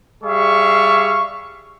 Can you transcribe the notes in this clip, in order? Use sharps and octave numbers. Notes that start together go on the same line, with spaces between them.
G3 G#4 E5 F5 C#6